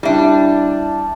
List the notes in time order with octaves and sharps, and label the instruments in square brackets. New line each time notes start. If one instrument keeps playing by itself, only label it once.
[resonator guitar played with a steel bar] G3 D4 [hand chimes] E4 E5